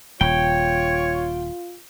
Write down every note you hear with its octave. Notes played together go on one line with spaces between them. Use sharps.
D#1 F4 C#5 G5